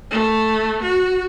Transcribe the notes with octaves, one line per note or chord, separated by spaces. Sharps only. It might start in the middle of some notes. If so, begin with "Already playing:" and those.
A3
F#4